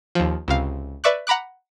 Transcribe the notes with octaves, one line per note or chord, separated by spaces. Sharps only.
D#2 F3
C#2 C3 F5
B4 D5 E5 C#6 D6 F#6
F#5 A#5 B5 D6 F#6